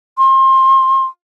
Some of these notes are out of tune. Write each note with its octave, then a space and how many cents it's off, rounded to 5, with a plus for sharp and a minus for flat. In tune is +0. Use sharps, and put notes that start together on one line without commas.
C6 +30